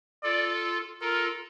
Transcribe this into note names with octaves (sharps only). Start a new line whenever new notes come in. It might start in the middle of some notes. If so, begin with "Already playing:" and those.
F4 A4 D5
F4 A4 A#4